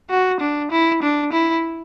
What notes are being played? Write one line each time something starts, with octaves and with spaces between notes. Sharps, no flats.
F#4
D4
E4
D4
E4